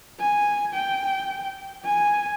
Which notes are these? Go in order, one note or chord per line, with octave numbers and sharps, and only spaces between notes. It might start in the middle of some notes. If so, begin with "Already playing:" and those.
G#5
G5
G#5